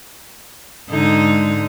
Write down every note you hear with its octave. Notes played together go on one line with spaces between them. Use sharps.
G#2 D3 D#4